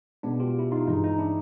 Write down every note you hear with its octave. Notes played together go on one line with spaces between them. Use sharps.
B2 G#3 B3 D4
F4 G4
E4
D#4 F4
G2 E3 G#3 D#4
D#4
D4 E4